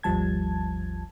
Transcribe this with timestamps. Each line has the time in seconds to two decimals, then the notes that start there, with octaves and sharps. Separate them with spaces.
0.03 G#1 D#2 F3 G3 A5 G#6